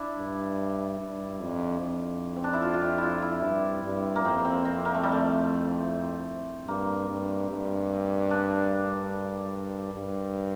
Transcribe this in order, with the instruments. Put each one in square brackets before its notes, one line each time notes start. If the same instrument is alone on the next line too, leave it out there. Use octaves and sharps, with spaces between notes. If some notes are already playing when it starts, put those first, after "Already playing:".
Already playing: [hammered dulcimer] D4 E4
[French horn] G2
G2
F2
F2
[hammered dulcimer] C4
D4
E4
F4
F4
G4
E4 F4
E4
[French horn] G2
G2
[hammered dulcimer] A#3
[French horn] F2 [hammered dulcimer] C4
[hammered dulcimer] C4
C4
A#3
A3
G3
A3
[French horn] G2 [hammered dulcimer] A#3
[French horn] G2
G2
[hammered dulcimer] D4
[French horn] G2